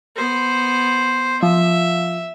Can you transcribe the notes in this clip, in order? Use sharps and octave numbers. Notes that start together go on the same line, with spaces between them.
B3 C5
F3 E5